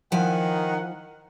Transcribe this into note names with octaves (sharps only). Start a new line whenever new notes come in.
D#3 F3 E4 F#5 G#5